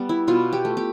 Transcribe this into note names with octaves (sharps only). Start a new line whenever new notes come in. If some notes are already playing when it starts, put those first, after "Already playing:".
Already playing: G3 B3 D5
E4
B2 F4
G4
A3
G4